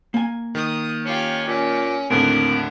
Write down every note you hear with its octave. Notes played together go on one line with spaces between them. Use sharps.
A#3 G#5
D#3 D#6
C#4 F4 G4
A#2 C#4
D#2 A2 D3 C4 D4 A#4